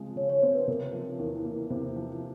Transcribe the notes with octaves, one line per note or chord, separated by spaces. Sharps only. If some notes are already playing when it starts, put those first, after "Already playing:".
Already playing: C#3 F3 G#3 C4
C#3 C#5
C#5
C4 C5
B4
C3 A#4
F3
E2 A#4
A#3
C3 C5
F3